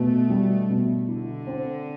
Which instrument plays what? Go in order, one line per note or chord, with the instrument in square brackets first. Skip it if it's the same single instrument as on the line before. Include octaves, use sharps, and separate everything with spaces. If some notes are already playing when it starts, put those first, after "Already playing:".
Already playing: [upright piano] B2 [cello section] A3
[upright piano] G3
B2
[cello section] D3 [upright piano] E4
[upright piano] C4